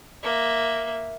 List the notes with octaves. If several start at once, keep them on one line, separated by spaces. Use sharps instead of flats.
A#3 E5